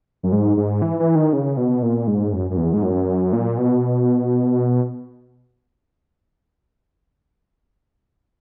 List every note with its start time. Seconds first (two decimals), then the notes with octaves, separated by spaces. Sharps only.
0.23 F#2
0.32 G#2
0.57 G#2
0.82 E3
1.00 E3
1.15 D#3
1.33 C#3
1.57 B2
1.83 A#2
2.07 G#2
2.32 F#2
2.51 F#2
2.57 E2
2.73 G#2
2.83 F#2
3.33 A#2
3.57 B2